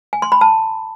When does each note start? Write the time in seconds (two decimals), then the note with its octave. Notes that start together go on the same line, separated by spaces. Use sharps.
0.13 G#5
0.22 C6
0.32 B5
0.41 A5